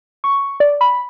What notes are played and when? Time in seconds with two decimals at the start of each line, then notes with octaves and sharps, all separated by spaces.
0.24 C#6
0.60 D5
0.81 B5